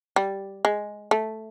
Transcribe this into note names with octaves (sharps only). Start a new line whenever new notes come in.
G3
G#3
A3